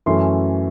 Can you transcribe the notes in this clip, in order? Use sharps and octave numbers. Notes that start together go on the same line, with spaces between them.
F#2 E3 A3 C#4 C6